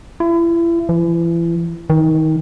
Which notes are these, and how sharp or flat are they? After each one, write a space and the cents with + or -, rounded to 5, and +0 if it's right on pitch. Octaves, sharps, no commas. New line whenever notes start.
E4 +35
E3 +35
D#3 +25